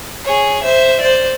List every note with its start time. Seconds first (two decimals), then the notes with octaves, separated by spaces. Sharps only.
0.24 G#4 C#5
0.63 C5 E5
1.00 C5 D5